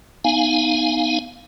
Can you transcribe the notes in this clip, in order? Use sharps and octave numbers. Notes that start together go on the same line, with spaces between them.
B3 D#4 F5 G#5